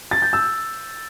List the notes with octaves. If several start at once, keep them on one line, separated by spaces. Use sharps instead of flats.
A6
G6
E6